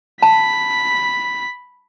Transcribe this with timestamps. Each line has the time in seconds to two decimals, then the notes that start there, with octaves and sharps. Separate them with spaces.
0.23 A5 B5 B6